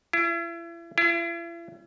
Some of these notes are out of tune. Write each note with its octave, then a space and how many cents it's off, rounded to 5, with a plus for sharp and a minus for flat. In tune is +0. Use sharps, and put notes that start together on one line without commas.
E4 +40
E4 +45